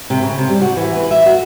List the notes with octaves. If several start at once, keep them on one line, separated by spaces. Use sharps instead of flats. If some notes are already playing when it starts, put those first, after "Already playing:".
C3
C#3
C3
G3
F#4
E3
B4
E5
F#4